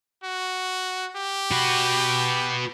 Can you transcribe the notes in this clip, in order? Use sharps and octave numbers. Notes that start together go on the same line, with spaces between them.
F#4
G4
F#4 B4